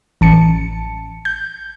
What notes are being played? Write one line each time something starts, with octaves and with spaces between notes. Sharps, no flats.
A1 A5 C#7
G6